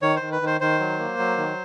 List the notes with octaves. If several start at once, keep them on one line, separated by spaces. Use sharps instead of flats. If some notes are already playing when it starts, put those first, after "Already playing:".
D#3 C#5
C5
D#3
B4
D#3 C5
D#3 C5
F#3
A#3
F#3
D#3